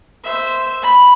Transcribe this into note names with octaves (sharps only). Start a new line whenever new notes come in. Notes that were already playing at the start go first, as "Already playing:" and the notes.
C5 E5
B5